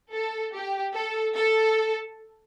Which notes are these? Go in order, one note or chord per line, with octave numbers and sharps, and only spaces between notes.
A4
G4
A4
A4